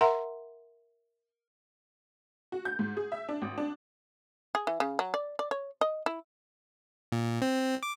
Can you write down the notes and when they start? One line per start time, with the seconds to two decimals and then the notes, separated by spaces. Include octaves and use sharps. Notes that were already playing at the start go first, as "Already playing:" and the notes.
0.01 A#4 E5 F#5 A#5 C6
2.52 F#4
2.65 G6
2.79 G#2
2.97 G#4
3.12 E5
3.29 D4
3.42 G#1
3.58 D4
4.55 G#4
4.67 E3
4.80 C#3
4.99 F#3
5.14 D5
5.39 D5
5.51 C#5
5.81 D#5
6.06 E4
7.12 A#2
7.42 C4
7.83 D6